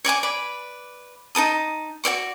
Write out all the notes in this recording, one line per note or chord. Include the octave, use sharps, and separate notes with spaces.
C#5 D5 G#5 D6
B4 D5 B5
D#4 A#4 A5 D#6
F#4 C#5 D5 C#6